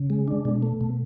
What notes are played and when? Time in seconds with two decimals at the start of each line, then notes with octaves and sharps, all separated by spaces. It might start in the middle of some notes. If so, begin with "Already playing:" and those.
Already playing: C#3
0.10 G#3
0.28 D4
0.45 B2
0.62 A3
0.81 B2